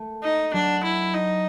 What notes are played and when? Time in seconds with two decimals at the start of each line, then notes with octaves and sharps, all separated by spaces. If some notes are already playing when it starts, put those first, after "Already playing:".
Already playing: A3
0.22 D#4
0.53 F#3 D4
0.84 E4
1.14 D#4